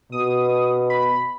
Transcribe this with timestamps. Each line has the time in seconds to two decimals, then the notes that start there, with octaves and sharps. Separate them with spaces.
0.12 B2 D#6
0.90 B5